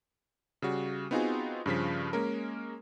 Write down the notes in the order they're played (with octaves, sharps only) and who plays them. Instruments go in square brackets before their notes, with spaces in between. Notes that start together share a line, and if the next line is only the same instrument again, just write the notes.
[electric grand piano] C#3 G3 F#4
B3 C4 D#4 F4 F#4 G#4
G2 C#3 F3 B6
G#3 A#3 C#4 A#4